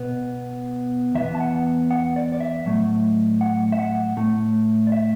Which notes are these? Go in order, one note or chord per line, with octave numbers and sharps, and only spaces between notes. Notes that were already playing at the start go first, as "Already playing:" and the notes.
Already playing: B2 B3
E2 E3 B3 E5
A5
F#5
F#5
D5
D5
E5
A2 F#3 A3
F#5
E5
F#5
A2 A3
D5
E5